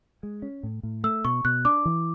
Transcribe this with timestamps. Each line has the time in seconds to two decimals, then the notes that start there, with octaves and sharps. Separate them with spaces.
0.23 G#3
0.42 C#4
0.63 A2
0.83 A2
1.04 A3 E6
1.25 B2 C#6
1.45 B2 F#6
1.65 D4 D6
1.85 E3